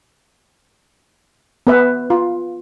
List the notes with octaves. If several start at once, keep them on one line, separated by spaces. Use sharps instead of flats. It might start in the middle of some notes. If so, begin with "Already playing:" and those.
B3 B4 E5
F4